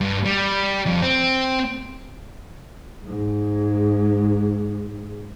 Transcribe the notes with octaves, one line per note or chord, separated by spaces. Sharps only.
G2
G3
F2
C4
G#2 G#3